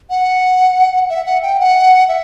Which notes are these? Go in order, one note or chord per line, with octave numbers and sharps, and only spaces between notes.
F#5
E5
F#5
G5
F#5
E5